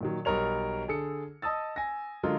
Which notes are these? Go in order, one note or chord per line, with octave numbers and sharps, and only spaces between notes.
A#2 D#3 F#3
B1 G3 A#4 C#5 F7
D3 G#4 A4 C#7
D#5 A5 D#6 E6 A6
G#5 A#6
D3 F#3 G#3 F4 A4 A#4